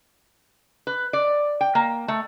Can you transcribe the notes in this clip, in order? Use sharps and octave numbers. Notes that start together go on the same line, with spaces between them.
B4
D5
G5
A#3
A3